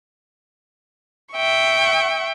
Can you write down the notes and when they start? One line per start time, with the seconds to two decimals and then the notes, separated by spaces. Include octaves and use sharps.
1.33 E5 G5 C#6